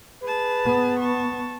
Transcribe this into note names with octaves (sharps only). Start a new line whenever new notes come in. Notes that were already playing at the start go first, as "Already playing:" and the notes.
G#4 B4 A5
B3
A5 C#6